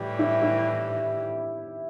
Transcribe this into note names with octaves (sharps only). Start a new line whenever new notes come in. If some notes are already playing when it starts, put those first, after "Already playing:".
Already playing: A2 E3 G3 G4
E4
E4